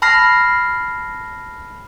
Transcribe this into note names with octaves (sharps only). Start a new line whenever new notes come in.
A5 B5 F6 A#6 C7